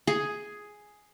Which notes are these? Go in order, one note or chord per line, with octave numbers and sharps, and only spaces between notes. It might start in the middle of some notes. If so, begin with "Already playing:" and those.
G#4